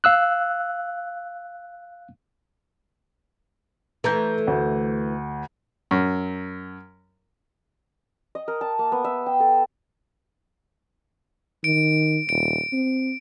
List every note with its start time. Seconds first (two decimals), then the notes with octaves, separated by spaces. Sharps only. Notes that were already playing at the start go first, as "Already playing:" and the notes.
0.04 F5 E6 F#6
4.04 E3 A3 A4 A#5 G6
4.47 D2
5.91 F#2
8.35 D#5
8.48 A#4
8.61 A5
8.79 A#3
8.92 B3
9.04 E5
9.26 G5
9.40 A4
11.64 D#3 D7
12.29 D#1 D7
12.72 C4